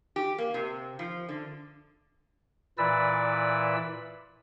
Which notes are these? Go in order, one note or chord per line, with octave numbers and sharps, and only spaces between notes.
G4
A#3
C3
F3
D3
A#2 E3 E4 B4 D5 E6